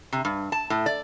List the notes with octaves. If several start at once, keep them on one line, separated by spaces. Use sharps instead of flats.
C3
G2
A5
A2
D5